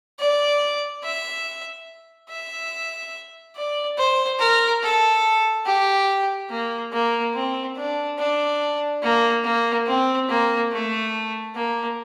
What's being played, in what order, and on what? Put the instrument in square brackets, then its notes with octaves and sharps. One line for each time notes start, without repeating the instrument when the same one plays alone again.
[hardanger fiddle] D5
E5
E5
D5
C5
A#4
A4
G4
A#3
A#3
C4
D4
D4
A#3
A#3
C4
A#3
A3
A#3